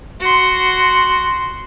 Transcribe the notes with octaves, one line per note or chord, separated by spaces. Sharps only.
F#4 C6